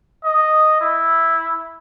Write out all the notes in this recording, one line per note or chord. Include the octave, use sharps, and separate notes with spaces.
D#5
E4